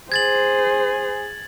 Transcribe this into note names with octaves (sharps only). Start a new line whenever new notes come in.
G#4 C5 G#6 A6 F#7